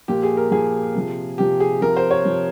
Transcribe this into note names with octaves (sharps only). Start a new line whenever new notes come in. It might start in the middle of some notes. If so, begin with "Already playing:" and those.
A#2 F3 G4
G#4
A#4
A#2 F3 G#4
C3 F3
C3 F3 G4
G#4
C3 F3 A#4
C5
C#5
C3 F3